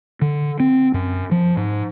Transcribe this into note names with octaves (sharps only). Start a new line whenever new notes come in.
D3
C4
F#2
F3
G#2